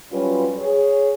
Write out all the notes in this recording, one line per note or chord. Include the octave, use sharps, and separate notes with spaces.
F#3 G3 C#4 F4 B4
G#4 C#5